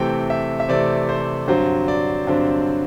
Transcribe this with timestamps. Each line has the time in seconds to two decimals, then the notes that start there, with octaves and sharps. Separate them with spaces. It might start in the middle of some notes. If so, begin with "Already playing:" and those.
Already playing: C3 E3 A3 C4 G5
0.30 E5
0.60 E5
0.69 C3 E3 A3 C4 D5
1.09 C5
1.48 G2 D3 F#3 C4 C5
1.88 D5
2.27 G2 D3 F#3 C4